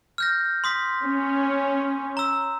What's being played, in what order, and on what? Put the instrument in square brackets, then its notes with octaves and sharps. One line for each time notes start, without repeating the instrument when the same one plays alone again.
[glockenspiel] F6 G6 A#6
C6 D#6 B6
[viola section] C#4
[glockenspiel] A#5 E6